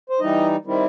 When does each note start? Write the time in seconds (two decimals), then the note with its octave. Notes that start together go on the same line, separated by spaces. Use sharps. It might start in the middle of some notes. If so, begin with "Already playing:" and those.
0.10 C5
0.20 E3 G3 D#4 D#5
0.65 D#3 G3 C4 E4